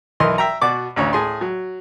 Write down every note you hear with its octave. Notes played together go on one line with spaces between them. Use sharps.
B1 E3 A#4 D#5 C6
E5 G5 A#5
B2 F#4 D5 D6
A1 D2 C#5
A2 G#4 C6
F#3